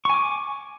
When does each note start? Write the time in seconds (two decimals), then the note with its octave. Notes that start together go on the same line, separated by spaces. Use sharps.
0.05 C#6
0.10 G#5
0.14 D6